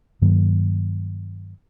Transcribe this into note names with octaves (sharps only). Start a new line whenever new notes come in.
G2 D#3 F#3 A#3